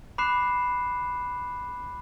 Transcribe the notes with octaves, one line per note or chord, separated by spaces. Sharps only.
B5 D6 F#6 C7 E7